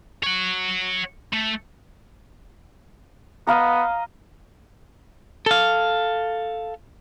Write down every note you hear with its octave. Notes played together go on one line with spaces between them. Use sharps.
C#5 F#5
A3
B3 D#5 F5 A#5
A4 F5